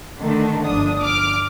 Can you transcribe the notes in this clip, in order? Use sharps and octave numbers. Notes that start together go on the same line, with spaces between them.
D3 D#3 A3 D4
G1 F3 D4 D#6
D6 F6